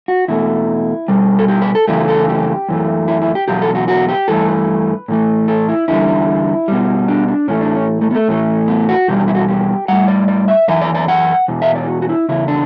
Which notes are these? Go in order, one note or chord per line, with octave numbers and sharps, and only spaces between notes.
F#4
E2 B2 A3 E4
B2 G3
A4
G4
B4
A4
F#2 C#3 E3 A3 G4
A4
G4
F#2 E3 A3
E4
E4
G4
E2 B2 F#3 G4
A4
F#4
F#4
G4
G2 E3 A3 A4
B4
A2 E3 A3
A4
E4
E2 D3 G3 E4
B2 G3
D4
D4
A2 E3 A3 C#4
D4
C#4
A3
B3
A3
A2 E3 A3
B3
F#4
E2 B2 G3 G4
D4
E4
F#4
G4
A2 G3 F#5
D5
D5
E5
F#2 E3 E5
D5
D5
F#5
E2 B2
E5
D5
F#4
F#4
E4
E2 C#3 E4
D4